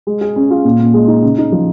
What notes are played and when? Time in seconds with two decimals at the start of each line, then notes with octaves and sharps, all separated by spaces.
0.07 G#3
0.21 G#4
0.36 C#4
0.50 F4
0.65 A#2
0.79 A#2
0.94 G#3
1.08 D#4
1.23 C#3
1.38 D#4
1.52 F3